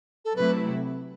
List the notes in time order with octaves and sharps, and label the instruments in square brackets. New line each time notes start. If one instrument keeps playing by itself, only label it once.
[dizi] A4
[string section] C3 F#3 A3 E4 [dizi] B4